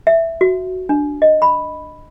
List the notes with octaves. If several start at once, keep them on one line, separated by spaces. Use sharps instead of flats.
E5
F#4
D4
D#5
B5